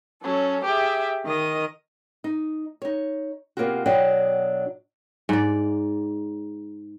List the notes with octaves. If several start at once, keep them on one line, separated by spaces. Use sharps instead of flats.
F#3 C#4 A4
G4 G#4 E5
D#3 D#5 D#6
D#4
D#4 C#5
C3 E3 A#3 B3 F4 F#4
B2 F#3 D4 D#5 F#5 G5
G#2 D5